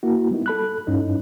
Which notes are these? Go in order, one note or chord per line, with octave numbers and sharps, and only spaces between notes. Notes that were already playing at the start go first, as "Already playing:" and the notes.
A#3 E4 F#4
G3 B3 D#4 E4
A4 B5 F#6
G2 C#4 D#4 E4